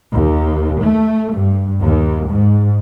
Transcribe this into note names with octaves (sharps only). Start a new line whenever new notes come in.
D#2
A3
G2
D#2
G#2